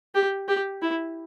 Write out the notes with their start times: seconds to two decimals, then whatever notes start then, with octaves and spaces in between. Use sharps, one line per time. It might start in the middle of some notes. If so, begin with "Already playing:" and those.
0.15 G4
0.48 G4
0.82 E4